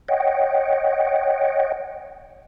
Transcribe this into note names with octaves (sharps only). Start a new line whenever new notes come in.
C#5 D#5 F#5 G5